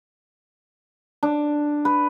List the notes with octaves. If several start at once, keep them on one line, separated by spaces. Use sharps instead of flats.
D4
B4